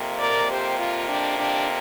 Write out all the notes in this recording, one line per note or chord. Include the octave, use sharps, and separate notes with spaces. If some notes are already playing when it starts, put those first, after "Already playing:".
Already playing: F2 C3 A#3
A#4 D5
G4 C5
F4
D4 G4
D4 G4